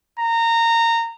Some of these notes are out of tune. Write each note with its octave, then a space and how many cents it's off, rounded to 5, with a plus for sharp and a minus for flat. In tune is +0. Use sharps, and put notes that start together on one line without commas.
A#5 -20